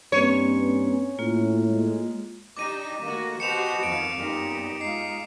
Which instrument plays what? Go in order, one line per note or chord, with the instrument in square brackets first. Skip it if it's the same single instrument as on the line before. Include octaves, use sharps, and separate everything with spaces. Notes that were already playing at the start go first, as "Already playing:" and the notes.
[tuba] G2 [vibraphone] A#3 C4 B4 [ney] C#4 [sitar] C#5
[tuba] A2 [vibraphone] A#3 F4
[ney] G#3
[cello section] D4 D#4 G4 [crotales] D6 D#7
[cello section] D#3 A3 F#4 [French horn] A#3
[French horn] B2 [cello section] F#4 G4 C5 [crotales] C#7 E7 F7
[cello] F2 [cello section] D#3 C4 F5 [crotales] D7
[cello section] F#2 B3 [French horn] A#2 [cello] D#4 G4
[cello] G#3 F4 [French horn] D#4 [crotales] C7